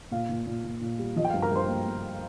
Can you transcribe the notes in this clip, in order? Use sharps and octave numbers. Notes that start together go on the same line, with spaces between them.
A#2 F5
A#2
A#2
A#2
A#2
G3
F3 D#5
G5
F5
G2
A#4 A#5
G2 C5 C6
A#3
A#3